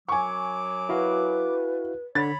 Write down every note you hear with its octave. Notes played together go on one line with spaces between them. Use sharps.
F#2 F#3 G#5 C#6 D6
E4 F#4 B4 F5
D3 C#5 B5 A6